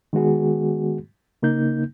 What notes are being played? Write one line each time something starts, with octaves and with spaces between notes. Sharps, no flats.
D#3 G#3 B3 F#4 G#4
C#3 A#3 D#4 G6